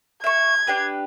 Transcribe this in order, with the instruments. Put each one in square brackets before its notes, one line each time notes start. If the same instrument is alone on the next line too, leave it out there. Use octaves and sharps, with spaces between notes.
[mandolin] E5 C#6 [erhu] G#6
[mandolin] D4 G4 B4